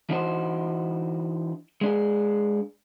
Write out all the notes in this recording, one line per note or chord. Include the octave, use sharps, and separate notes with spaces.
E3 D4 D#4 F#4 B4 C5
G#3 D4 G#4